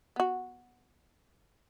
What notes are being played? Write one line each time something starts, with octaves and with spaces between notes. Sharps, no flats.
B3 F#4